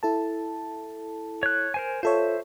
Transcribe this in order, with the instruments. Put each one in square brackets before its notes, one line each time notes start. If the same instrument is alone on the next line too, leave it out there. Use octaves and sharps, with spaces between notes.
[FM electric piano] E4 A4 A5
[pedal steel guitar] C#5 F#6
A#4 C5 G#5
[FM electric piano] F4 A4 C#5 [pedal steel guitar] C5 E5